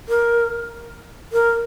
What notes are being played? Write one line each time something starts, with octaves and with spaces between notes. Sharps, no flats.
A#4
A#4